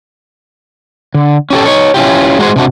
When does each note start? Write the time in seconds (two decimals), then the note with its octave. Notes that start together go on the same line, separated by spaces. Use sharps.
1.14 D3
1.50 C#4 G4 A4
1.66 D#4 C#5
1.94 C#4 E4 F4 G4
2.39 G#3 F#4 G#4 C5
2.56 C3 D4 F#4